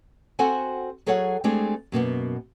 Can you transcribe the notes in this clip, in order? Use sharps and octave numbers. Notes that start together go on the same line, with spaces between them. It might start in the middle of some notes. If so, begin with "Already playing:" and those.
C4 F#4 A4 C5 F#5 G#5
F#3 G#4 A4 C#5 F5 F#5
G#3 A3 C4 D4 G4 G#4
F#2 B2 A#3 B3